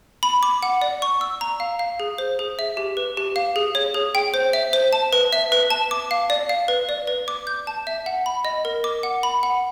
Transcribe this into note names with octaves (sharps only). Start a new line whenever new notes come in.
B5
D6
F#5
D5
C#6
E6
A#5
F5
F5
G#4
C5
G#4
E5
G4
B4
G4
F5
G#4
C#5
G#4
G5
C5
E5
C5
A5
B4
E5
B4
A5
D6
F5
D5
F5
B4
D5
B4
D6
G6
A5
E5
F#5
B5
D#5
A#4
D6
F#5
B5
F#5